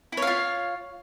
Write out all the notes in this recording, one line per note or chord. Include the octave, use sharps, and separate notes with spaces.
E4 F4 C#5 F5